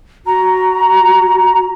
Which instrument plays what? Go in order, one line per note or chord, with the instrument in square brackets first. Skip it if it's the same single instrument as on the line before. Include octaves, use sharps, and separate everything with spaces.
[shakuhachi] F#4 [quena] A#5